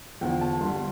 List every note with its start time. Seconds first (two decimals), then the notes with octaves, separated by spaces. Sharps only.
0.21 E2 D3 F3 G5
0.41 A5
0.61 G2 D3 G3 C6